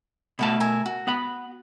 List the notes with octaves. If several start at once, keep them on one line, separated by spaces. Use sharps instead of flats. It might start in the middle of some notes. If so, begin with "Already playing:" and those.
B2 A3 E4 F#4 F5 A5
A#4 E5 G#5
F#4
B3 F#5 B5